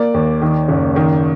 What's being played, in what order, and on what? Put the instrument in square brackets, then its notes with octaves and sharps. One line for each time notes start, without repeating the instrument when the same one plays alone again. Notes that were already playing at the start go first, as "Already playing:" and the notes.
Already playing: [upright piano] A#3 D5
D#2
D#3
F#1
D#3